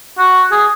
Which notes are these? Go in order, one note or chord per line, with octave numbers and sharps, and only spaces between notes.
F#4
G#4